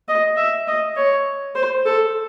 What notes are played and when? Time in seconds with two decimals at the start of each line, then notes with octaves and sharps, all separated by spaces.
0.09 D#5
0.37 E5
0.67 D#5
0.97 C#5
1.55 C5
1.86 A4